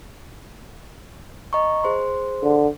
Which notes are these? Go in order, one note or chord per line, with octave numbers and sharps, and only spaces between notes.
D#5 A#5 C#6
G#4 C5 C6
D3